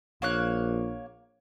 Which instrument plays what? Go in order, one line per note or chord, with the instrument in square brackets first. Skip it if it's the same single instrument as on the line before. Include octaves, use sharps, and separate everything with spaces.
[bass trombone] A#1 [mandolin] A#3 C#5 F#6